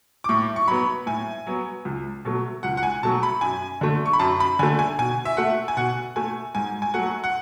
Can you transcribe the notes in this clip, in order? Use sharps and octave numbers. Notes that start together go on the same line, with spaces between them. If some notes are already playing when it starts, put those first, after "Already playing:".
D6
A2 C#6
C#6
F#3 B3 B5
A2 G#5
F#3 B3
C#2
B2 F#3 A3
C#2 F#5
F#5
G#5
B2 F#3 A3 A5
B5
F#2 G#5
D3 A3
C#6
B5
F#2 A5
B5
D3 A3 G#5
G#5
B2 G#5
E5
A3 F#5
G#5
B2 F#5
A3 G#5
G#2 G#5
G#5
F#3 A3 F#5
F#5